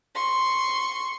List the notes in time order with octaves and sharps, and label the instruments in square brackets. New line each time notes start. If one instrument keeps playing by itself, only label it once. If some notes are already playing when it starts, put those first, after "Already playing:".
[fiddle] C6 C#6